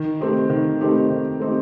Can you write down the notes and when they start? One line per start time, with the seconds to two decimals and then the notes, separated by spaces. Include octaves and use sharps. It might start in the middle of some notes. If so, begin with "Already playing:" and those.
Already playing: D#3
0.20 A3 C4 D#4 G4
0.50 D#3
0.81 A3 C4 D#4 G4
1.10 D#3
1.40 A3 C4 D#4 G4